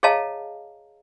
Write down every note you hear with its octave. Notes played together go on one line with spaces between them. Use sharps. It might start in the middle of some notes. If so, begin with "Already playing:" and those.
G#4 C#5 D#5 F5 A5 A#5